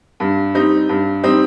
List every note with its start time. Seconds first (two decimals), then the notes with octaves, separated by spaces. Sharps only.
0.20 G2
0.54 G3 C4 D#4
0.89 G2
1.24 G3 C4 D#4